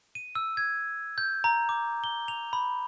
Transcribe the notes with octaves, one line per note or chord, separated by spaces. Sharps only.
D#7
E6
G#6
G6
A#5
D6
G7
F7
B5